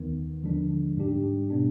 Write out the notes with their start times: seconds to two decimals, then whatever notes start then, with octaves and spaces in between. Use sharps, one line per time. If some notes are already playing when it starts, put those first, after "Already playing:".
Already playing: D#2 D#3 B3
0.42 D#2 D3 F3 G#3 D4
0.97 G#2 G3 D4 G4
1.50 B2 B3 D4